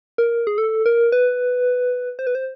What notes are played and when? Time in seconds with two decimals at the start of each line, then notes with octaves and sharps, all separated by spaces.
0.18 A#4
0.47 G#4
0.58 A4
0.86 A#4
1.12 B4
2.19 C5
2.27 B4
2.35 C5